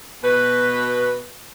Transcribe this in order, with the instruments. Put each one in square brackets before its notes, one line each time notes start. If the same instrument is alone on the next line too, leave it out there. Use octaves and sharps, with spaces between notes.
[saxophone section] B2 B4